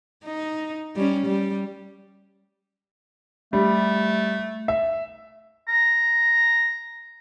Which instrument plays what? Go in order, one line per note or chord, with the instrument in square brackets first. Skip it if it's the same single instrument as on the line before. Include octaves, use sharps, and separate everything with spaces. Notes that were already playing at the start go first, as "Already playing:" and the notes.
[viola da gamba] D#4
G3 C#4
G3
[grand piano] G3 [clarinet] A3
[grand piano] E5
[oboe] A#5